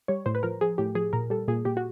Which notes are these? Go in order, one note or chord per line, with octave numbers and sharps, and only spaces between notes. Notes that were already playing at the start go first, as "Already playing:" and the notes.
G3 C#5
A2 C5
B4
F3 A#4
F3 G#4
A2 G4
F3 G#4
A#2 A#4
G3 A4
A#2 G#4
A#2 G4
F#4